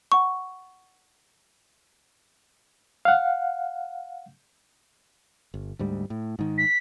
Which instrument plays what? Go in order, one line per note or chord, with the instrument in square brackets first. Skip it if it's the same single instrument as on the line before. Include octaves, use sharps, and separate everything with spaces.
[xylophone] F#5 C#6
[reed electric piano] F5 F#5
[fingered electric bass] G1
D2 G#2 G3
A2
G#2 D#3
[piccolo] B6